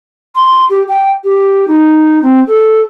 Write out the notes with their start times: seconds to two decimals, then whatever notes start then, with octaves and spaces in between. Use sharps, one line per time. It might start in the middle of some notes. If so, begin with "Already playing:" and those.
0.35 C6
0.70 G4
0.88 G5
1.24 G4
1.68 D#4
2.22 C4
2.47 A4